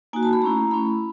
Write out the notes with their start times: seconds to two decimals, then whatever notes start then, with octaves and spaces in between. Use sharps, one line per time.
0.13 A#3 D#4 F#4 G#5
0.23 A5
0.33 B5
0.42 A3 C#4 E4 A#5
0.71 A3 C#4 E4 B5